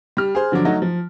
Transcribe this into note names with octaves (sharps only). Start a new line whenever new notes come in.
G3 F6
G#4 C5
D3 F3 F#3 D4
F#3 A3 D#4 F#4
F3